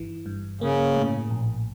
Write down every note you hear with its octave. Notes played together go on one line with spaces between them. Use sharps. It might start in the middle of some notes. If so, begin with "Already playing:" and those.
Already playing: G1 E3
G2
C#3 A#3
A2
A#1